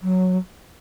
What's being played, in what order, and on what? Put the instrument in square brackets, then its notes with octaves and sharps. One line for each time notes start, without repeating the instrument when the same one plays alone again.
[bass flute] F#3